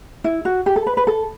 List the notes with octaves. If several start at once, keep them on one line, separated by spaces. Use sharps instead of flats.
E4
F#4
G4
A4
B4
B4
A4